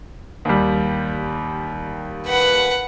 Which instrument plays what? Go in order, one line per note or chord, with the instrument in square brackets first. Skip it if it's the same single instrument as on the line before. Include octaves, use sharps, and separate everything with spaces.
[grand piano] D#2 G3
[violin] B4 F#5